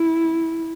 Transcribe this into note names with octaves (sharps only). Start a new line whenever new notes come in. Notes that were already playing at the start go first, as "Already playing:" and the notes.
Already playing: E4